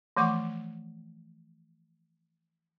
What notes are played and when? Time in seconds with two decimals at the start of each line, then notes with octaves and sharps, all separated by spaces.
0.17 E3 F3 A3 F#5 C#6 D6